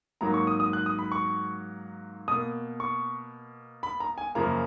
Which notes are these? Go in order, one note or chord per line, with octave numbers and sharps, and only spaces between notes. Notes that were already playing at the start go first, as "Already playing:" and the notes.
G#2 F#3 A#3 A#5
C#6
D#6
D#6
F#6
D#6
B5
C#6
B2 A#3 D#6
C#6
B5
A#5
G#5
F#2 C#3 F3 A#3 A#5